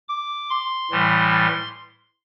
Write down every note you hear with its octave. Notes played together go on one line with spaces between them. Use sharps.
D6
C6
A2 E3 G3